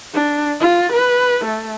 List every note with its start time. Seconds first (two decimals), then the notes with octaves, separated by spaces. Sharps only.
0.14 D4
0.60 F4
0.93 B4
1.45 A3